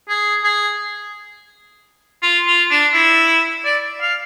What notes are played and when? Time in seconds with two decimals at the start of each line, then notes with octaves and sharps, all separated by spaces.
0.09 G#4
0.44 G#4
2.22 F4
2.47 F4
2.70 D4
2.93 E4
3.65 D5
4.01 F5